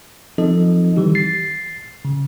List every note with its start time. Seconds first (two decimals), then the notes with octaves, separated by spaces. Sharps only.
0.38 F3 C4 D#4 A4 D#5
0.97 D#3 E3 G3 G4
1.15 A6 C7
2.05 C#3